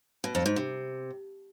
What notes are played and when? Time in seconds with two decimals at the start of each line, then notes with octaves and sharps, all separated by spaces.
0.24 B2
0.35 F2
0.46 G#2
0.56 C3